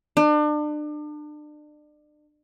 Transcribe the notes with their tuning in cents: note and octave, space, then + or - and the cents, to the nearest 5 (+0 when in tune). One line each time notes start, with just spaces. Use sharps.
D4 +35